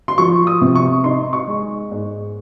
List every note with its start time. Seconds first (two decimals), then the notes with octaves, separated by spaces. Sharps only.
0.08 C6
0.18 F3 C#6
0.47 D#6
0.61 C3
0.75 C#6
1.04 D#4 C6
1.33 C#6
1.47 G#3
1.91 G#2